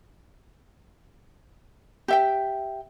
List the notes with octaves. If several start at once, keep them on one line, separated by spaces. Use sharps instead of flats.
G4 E5 G5